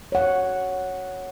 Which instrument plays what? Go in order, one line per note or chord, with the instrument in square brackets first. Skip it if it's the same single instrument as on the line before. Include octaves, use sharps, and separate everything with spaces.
[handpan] C#5 F#5